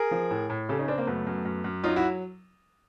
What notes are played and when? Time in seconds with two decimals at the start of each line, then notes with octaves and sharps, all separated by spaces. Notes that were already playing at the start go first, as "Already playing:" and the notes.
Already playing: G#4 A#4
0.11 F3
0.31 A2
0.50 A2
0.69 C#3 G4 A4
0.78 C#4 D#4
0.88 C#3 C4 D4
0.98 A#3 C4
1.07 F#2 A3 B3
1.27 F#2
1.45 F#2
1.64 F#2
1.83 F#3 D#4 F4
1.96 E4 F#4